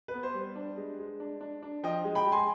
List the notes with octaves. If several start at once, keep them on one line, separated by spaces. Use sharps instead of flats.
B4
B3
C5
G3
D4
G#3
G#3
D4
D4
D4
F3 D#5 G5
G#3
G5 B5
G#3
G#5 C6